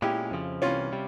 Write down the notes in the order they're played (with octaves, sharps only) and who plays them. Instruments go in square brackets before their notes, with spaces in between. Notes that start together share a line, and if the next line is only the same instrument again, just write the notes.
[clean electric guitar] A#2 G#3 C#4 [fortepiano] E4 G4
[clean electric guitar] F2 C#3 F3
[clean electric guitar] C2 C3 E3 [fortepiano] C#4 F4
[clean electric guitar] C3 G3